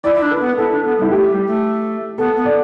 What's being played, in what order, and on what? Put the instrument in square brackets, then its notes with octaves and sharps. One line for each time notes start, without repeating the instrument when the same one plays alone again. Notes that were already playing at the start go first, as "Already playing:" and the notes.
[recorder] E4 [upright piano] D5
[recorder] E4
D4
[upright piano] B4
[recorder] B3
[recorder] E4 [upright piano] A4
[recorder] D4
B3
[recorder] G3 [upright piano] E4
[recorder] A3 [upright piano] G4
[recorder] G3
A3
[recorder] B3 [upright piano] A4
[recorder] B3
[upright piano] D5